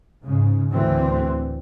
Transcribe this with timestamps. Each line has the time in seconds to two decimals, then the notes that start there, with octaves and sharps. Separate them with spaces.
0.23 G#2 C#3
0.70 D2 A2 E3 C4